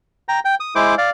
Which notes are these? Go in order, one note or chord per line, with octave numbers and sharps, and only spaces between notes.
G5 A#5
G5
D#6
G#3 E4 C5 D6
D5 F5